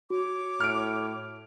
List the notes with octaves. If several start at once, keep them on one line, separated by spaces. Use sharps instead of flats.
F#4 C#5 D6
A2 F6 D7